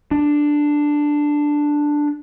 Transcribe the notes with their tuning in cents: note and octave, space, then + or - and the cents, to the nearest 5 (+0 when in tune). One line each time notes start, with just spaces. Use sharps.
D4 +5